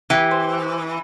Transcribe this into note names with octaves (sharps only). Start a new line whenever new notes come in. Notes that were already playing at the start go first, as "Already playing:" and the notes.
E3 G4
C5